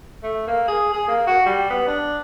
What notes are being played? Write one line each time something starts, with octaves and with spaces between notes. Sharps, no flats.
A3
A#3
G#4
G#4
A#3
F#4
G3
B3
D4